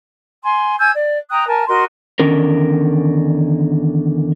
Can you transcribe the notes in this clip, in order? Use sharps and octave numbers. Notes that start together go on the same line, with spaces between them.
G#5 C6
G#5 E6 G6 G#6
D5
G5 A#5 D#6 F#6
A#4 G#5 A5
F#4 A#4 D#5 C6
E2 D3 D#3 C#4 A#4